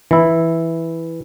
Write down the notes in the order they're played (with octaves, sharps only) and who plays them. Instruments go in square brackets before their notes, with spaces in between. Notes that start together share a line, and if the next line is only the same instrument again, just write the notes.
[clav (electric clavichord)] E3 E4